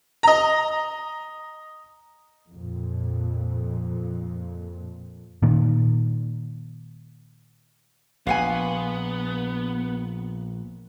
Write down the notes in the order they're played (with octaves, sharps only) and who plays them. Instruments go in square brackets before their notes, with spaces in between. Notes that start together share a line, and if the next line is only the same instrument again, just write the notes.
[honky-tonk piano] D#5 A#5
[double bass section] F2 A#2
[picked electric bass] A#2 D#3
[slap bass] A#1 [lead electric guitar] B3 [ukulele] F5 F#5 G#5